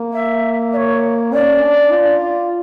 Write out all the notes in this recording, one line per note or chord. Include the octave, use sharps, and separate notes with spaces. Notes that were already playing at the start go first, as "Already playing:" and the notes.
Already playing: A#3
E5
D5
C#5
C#4 D5
D4
F4